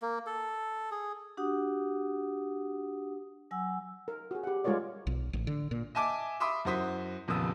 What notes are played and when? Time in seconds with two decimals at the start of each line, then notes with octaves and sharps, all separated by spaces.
0.02 A#3
0.27 A4
0.91 G#4
1.37 D4 F#4 G4 F#5 D#6
3.51 F#3 F#5 G#5 E6
4.08 A#4
4.31 F#4 G#4
4.43 G4 F#5
4.64 G3 G#3 F4 A#4 C#5 D5
5.07 B1
5.33 A1
5.47 D3
5.71 A#2
5.95 D#5 E5 G#5 A5 D6
6.40 E5 B5 C6 D6 D#6
6.65 F#2 E4 F#4 C5 D#6 B6
7.28 D#1 F2 C#3 B3 D#6 E6